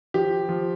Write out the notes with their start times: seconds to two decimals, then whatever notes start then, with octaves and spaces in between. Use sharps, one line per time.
0.14 F3 G4
0.49 F3